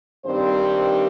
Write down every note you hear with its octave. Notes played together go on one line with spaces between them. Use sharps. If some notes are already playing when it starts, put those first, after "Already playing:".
G2 D#3 G3 C4 C5